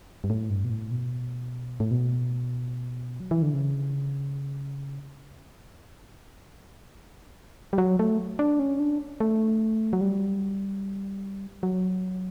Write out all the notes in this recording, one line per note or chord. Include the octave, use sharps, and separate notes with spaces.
G2
A2
G2
B2
A2
B2
A2
B2
F#3
E3
D3
C#3
G3
F#3
A3
D4
C#4
D4
A3
F#3
G3
F#3